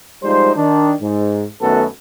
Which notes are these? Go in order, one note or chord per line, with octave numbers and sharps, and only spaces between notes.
F3 G3 G#3 D#4 C5
D#3 D4
G#2
F#2 D#3 A3 B3 F#4 A4